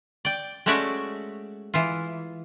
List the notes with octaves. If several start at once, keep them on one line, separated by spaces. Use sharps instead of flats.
D5 G5
G#3 A3 C#4 F#4 D5 E5
E3 F4